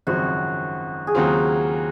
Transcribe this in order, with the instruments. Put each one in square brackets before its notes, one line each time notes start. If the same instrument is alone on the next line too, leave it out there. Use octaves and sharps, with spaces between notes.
[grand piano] G#1 F#2 C#3 F3 C4 [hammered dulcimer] F#4
[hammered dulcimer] G#4
[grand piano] D#2 C#3 F#3 C4 F4 [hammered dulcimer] F#4